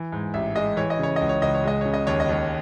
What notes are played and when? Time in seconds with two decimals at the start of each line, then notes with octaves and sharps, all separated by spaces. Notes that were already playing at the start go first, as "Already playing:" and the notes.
Already playing: E3
0.12 G#2
0.34 A1 E5
0.56 G#3 D#5
0.77 E3 C#5
0.90 D#5
0.99 C#3 C#5
1.16 C#2 D#5
1.29 C#5
1.42 C#2 D#5
1.54 C#5
1.64 G#3 D#5
1.81 C#3 C#5
1.94 D#5
2.07 D#2 C#5
2.20 D#5
2.29 D#2 C#5